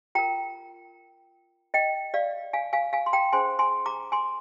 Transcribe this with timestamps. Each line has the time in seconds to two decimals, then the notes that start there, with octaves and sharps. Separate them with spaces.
0.15 F4 A#4 G5 A#5
1.74 D#5 G5
2.14 D5 F5
2.53 F5 G#5
2.73 F5 G#5
2.93 F5 G#5
3.06 C6
3.13 G5 A#5
3.32 D4 G#4 C5 G#5 C6
3.59 G#5 C6
3.86 A#5 D6
4.12 G#5 C6